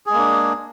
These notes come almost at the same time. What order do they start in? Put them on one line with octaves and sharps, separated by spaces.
G#4 G#3 A#3 D4